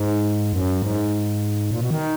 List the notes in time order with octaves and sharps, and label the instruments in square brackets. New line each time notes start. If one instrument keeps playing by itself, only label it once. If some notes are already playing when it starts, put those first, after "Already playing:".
Already playing: [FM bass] G#2
F#2
G#2
A#2
B2
D#3